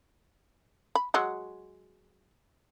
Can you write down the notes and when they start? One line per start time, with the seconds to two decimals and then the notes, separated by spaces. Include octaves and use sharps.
0.95 B5
1.14 F#3 G#3 F#4